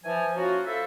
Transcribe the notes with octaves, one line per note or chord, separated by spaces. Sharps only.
E3 F3 G#5
A#3 C#4 F4 F#4
E4 F4 A4 C5 E5